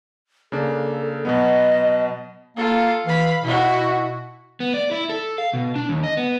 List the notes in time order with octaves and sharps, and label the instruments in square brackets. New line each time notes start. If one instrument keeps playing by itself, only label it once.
[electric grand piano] C#3 A#3 D4 [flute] A4
[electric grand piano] B2 F#3 B3 [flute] D#5
[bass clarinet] A#3 [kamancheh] F4 A4
[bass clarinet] E3 [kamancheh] F5 B5
[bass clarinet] B2 [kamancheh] E4 F#4
[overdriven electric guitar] B3
D5
E4
A4
F5
B2
D4
D#2
D#5
B3